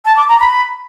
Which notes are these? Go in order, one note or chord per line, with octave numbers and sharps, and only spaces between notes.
A5
D6
A#5
B5